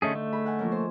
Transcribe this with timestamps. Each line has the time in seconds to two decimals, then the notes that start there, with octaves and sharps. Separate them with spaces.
0.02 D3 A3 C#4 D#4 G#4
0.15 A3
0.33 G#4 B5
0.46 F#5 G#5
0.59 F3 A#3 C#4
0.72 C5